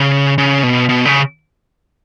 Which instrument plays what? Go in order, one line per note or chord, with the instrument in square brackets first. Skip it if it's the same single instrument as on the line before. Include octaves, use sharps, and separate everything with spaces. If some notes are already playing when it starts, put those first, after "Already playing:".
Already playing: [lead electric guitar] C#3
C#3
B2
B2
C#3